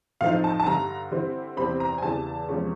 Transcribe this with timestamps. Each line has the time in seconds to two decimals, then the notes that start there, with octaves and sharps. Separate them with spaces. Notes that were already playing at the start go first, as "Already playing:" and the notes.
0.21 A2 F3 A3 C4 D#4 F5
0.44 A5
0.60 A5
0.66 G2 D3 G3 A#5
1.11 D3 G3 C4 E4
1.57 E2 C3 E3 G3 C4 B5
1.80 A#5
1.98 G#5
2.02 E2 C#3 E3 G3 A5
2.49 E2 C3 F3 G#3 C#4